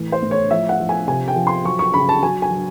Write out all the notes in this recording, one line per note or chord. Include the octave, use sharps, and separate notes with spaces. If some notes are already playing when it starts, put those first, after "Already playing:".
Already playing: A2 E3
C5
A2
C#5
F3 E5
F#5
F3
G#5
C3 G#5
G5
F3
C6
F#3 C#6
C#6
C#3 B5
A5
F#3 G#5
G#5
F#3